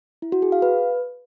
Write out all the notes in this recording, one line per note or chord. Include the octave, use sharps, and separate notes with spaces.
E4
F#4
G#4
F5
B4